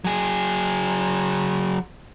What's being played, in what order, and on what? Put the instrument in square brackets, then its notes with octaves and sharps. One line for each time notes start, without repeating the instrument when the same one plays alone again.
[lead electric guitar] F#3 G#4